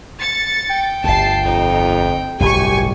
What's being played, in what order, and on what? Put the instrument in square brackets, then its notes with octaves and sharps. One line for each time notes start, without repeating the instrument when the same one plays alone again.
[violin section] A6 C#7
[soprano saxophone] G5
[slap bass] G1 D2 [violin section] A5 C7
[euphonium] F2 [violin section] D#4
[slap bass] D1 G1 C2 [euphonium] G4 [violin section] G#5 C#6